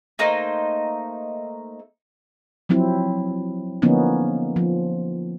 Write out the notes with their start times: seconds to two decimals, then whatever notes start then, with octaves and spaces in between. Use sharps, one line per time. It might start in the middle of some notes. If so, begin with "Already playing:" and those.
0.19 A3 A#3 D#4 C5
2.69 F3 F#3 C4 E4
3.82 D3 F3 A#3 B3 C#4 D#4
4.56 F3